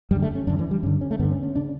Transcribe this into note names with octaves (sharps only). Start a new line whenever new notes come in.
F#2 D3 G3
A3
C#4
F#2 D3 D4
E3
G3
G2 D3 C#4
C#4
A3
G2 D3 B3
C#4
C#4
C#3 D4